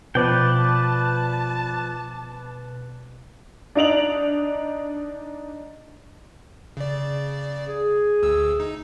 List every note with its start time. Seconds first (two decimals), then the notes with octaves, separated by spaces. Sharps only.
0.15 B2 F3 B4 D5 G5 A5
3.75 D4 D#4 D7 F7 F#7
6.77 C#3 D5
7.67 G#4
8.23 D2 E6
8.60 D#4